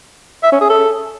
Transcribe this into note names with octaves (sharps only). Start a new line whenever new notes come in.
E5
C#4
G#4
A4